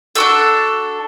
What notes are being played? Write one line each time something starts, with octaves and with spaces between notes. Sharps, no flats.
D4 F#4 A4 E6